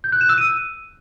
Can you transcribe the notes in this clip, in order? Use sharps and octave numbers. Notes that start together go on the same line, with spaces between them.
G6
F#6
E7
E6
D#7